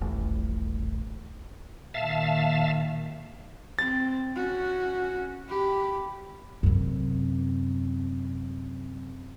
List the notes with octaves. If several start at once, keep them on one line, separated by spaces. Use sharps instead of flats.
D#1 A1 A2
A#2 D#3 E5 F5 A5
C4 A6
C#4 F#4
G4 B5
F#2 C3